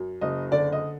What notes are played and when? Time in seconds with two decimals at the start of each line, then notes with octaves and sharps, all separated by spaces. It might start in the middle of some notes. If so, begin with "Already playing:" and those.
Already playing: F#2
0.21 F#1 D#5
0.52 D3 D5
0.72 D#5